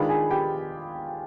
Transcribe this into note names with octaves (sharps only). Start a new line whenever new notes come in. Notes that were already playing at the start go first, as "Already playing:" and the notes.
Already playing: D#3 G#3 D4 F4 B4 B5
G#4 G#5
G4 G5